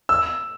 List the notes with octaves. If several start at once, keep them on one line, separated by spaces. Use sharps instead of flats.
E6